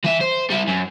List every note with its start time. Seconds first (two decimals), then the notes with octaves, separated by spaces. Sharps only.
0.05 E3 E5
0.21 C5
0.50 G3 E4
0.68 F#2